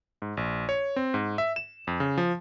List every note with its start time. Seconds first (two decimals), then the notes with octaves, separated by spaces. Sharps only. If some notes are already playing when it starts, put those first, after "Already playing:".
0.22 G#2
0.37 A#1
0.69 C#5
0.96 C4
1.14 G#2
1.38 E5
1.56 E7
1.87 F2
2.00 C#3
2.18 F3